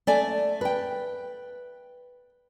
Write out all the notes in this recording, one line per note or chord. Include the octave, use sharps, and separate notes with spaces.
A3 D5 G#5
B4 G5